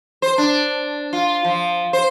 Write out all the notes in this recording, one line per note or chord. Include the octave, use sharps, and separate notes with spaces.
C5
D4
F4
F3
C5